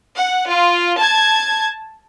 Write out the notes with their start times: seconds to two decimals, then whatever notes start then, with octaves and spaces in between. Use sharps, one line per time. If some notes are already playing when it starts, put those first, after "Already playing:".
0.17 F#5
0.49 F4
0.98 A5 G#6